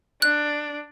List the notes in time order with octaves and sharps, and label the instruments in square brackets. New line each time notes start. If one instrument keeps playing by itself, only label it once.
[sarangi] D4 [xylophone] F#6